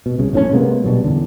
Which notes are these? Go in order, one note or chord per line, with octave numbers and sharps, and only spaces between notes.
B2
C2 C#3
A#1 A2 C4 C#4
C3 G#3 A#3 B3
G2 B2 F#3
E2 D3